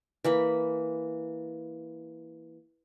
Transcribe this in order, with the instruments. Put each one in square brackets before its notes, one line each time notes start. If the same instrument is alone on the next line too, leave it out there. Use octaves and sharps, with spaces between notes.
[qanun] E3 A#3 B5